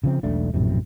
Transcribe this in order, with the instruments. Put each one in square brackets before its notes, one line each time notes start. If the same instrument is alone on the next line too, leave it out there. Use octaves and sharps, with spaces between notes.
[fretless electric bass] C#3 F3 C4
E1 B1 A3 D4
A#1 F#2 A2 C3